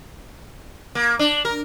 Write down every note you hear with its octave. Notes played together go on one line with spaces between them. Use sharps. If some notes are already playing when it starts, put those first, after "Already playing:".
A#3
D4
A#4